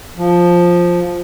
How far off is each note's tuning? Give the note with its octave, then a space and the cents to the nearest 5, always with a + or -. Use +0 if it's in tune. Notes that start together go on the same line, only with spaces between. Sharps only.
F3 +5